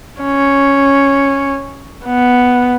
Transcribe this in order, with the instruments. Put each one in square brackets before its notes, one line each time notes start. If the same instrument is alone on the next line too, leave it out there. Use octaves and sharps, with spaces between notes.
[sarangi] C#4
B3